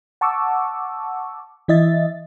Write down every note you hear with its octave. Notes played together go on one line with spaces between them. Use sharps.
F#5 A5 C#6 D6 E6
E3 E4 D#5 E5 A6